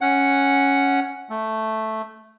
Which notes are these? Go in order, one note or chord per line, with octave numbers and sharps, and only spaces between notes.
C#4 F#5
A3